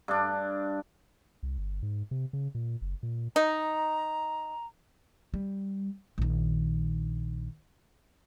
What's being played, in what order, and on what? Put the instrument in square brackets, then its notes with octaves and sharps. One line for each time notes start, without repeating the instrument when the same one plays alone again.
[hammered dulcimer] G2 D4
[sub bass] C2
G1
G#2
C3
C#3
A#2
F#1
A#2
[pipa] D#4 [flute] A#5
[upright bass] G3
A#1 D#3